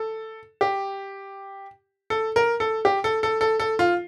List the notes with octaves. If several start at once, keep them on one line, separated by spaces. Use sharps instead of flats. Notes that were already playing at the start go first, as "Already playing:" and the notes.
Already playing: A4
G4
A4
A#4
A4
G4
A4
A4
A4
A4
F4